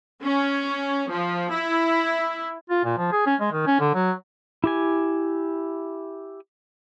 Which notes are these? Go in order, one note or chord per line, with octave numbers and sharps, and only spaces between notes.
C#4
F3
E4
F4
A#2
F3
G#4
C#4
G#3
D#3
C#4
D3
F#3
E4 G4 G#5